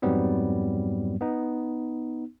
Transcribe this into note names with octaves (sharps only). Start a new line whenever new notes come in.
F2 G#2 F#3 G3 B3 C4
B3 D#4